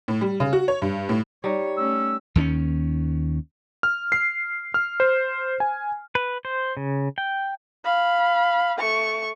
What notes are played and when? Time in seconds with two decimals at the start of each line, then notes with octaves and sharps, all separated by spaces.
0.08 A2
0.21 G3
0.40 C#3
0.53 F#4
0.68 C#5
0.82 G2
1.09 A2
1.44 G3 D#4 C#5
1.77 A3 C#4 E6
2.36 D#2 D#3 C4 C#4
3.83 F6
4.12 C7
4.74 F6
5.00 C5
5.60 G#5
6.15 B4
6.45 C5
6.77 C#3
7.18 G5
7.84 F5 B5
8.78 A3 C#6